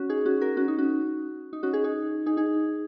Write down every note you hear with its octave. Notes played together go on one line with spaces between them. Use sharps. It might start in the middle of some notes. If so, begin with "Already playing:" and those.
Already playing: C#4 F#4
D#4 G#4
C#4 F#4
F#4 A#4
C#4 F#4
D#4
C#4 F#4
D#4
C#4 F#4
D#4 G#4
D#4 G#4
D#4 G#4
D#4 G#4